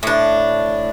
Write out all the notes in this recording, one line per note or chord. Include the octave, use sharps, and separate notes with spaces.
A2 D4